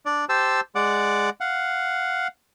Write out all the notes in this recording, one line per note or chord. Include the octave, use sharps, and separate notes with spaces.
D4 D5
G4 C5 A5 E6
G#3 D5 F#5 D6
F5 F#5